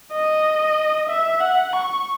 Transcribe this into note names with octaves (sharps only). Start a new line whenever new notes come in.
D#5
E5
F#5
C#6